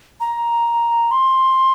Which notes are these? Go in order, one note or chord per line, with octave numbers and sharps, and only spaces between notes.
A#5
C6